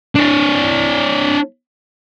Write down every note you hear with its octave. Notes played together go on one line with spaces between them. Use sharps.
D4 C#5